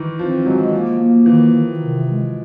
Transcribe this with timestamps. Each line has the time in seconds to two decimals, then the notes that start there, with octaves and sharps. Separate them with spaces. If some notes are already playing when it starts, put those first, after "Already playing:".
Already playing: D#3 E3
0.19 F3 C4
0.46 F#3 G#3
0.72 F3 A#3
0.99 A#3
1.26 D#3 E3
1.54 D#3
1.80 C3
2.07 G#3